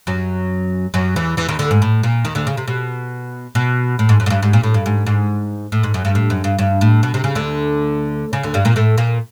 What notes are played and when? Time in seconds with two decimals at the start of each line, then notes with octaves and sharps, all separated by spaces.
0.07 F#2 F#3
0.94 F#2 F#3
1.16 E2 E3
1.37 E2 E3
1.49 D#2 D#3
1.59 D2 D3
1.71 G#2
1.82 A2
2.03 A#2
2.25 D#2 D#3
2.35 D2 D3
2.47 C#3
2.57 C3
2.68 B2
3.55 B2
3.99 A2
4.09 G#2
4.20 F#2
4.26 G#2
4.30 G2
4.42 G#2
4.53 A#2
4.63 A2
4.74 G2
4.86 G#2
5.06 G#2
5.72 A2
5.83 G#2
5.94 F#2
6.05 G2
6.15 A2
6.30 F#2
6.44 G2
6.59 G2
6.81 A2
7.03 B2
7.14 C3
7.24 C#3
7.35 D2 D3
8.33 C#3
8.43 D2 D3
8.54 G2 G3
8.65 A#2 A#3
8.76 A2 A3
8.98 A#2 A#3